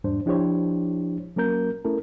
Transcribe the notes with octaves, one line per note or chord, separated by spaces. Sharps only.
E2 G#2 G3 D4 C5
F3 D4 E4 G4 C5 C#5
F#3 A#3 C#4 A#4 G6
A3 C#4 E4 A4 A#4